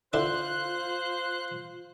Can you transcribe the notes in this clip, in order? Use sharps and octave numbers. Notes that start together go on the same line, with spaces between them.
D3 E4 F4 C5 D5 F#6